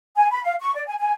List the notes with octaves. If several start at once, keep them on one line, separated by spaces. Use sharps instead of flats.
G#5
B5
F5
C#6
D5
G#5
G#5